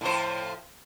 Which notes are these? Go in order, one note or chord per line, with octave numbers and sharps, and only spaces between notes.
A2 F3 C5